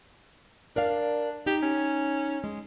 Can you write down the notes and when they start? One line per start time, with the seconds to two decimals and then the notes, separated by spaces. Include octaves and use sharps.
0.76 D4 A#4 D5 F5
1.46 D#4 G4
1.63 C#4
2.44 G#3